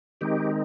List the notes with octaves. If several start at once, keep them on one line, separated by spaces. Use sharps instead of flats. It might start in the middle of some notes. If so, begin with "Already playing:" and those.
D#3 G#3 C4 D#4 G4